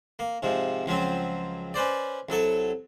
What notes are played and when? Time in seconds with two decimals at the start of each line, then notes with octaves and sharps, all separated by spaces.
0.19 A#3
0.43 G#2 C3 F3
0.86 C#2 F3 F#3 C4
1.74 C#4 B4 C5 D5
2.29 C2 F#3 A4 C#6